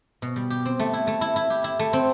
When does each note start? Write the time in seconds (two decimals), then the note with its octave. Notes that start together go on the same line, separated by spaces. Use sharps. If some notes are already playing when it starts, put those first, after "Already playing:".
0.22 B2
0.36 G3
0.50 G4
0.66 C4
0.80 A3
0.93 E4
1.07 A3
1.21 E4
1.36 E4
1.50 G4
1.64 E4
1.79 A3
1.93 C4